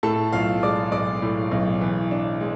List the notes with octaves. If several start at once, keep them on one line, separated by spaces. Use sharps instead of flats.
A2 A4 A5
B1 F4 F5
G#3 D5 D6
B1 D5 D6
A2
B1
E3
D4
G#3